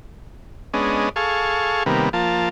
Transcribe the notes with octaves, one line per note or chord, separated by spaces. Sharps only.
G#3 B3 C#4 D4 D#5
G#4 A4 F5 C#6
C3 D#3 G3 A#3 B3
F3 A#3 F4 A5